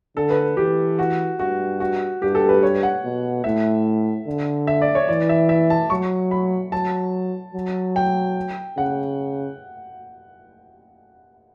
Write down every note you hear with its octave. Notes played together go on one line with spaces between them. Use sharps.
D3 A4
B4
E3 G4
F#4
G2 F#4
F#4
G2 G4
A4
B4
C#5
F#5
B2
A2 E5
D3
E5
D5
C#5
E3 D5
E5
E5
A5
F#3 C#6
B5
F#3 A5
F#3
G5
C#3 F#5